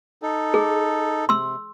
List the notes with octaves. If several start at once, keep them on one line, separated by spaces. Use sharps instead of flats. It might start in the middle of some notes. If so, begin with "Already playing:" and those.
D#4 A4
G#4
C3 C6 E6